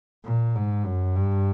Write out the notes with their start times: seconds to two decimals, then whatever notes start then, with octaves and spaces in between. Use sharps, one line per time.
0.24 A#2
0.55 G#2
0.85 F#2
1.15 G2